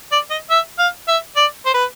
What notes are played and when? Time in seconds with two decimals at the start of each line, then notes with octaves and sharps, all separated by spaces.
0.12 D5
0.31 D#5
0.50 E5
0.79 F5
1.08 E5
1.36 D5
1.65 C5
1.74 B4